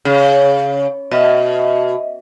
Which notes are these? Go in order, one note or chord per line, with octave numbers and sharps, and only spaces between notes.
C#3
B2 D#5 E5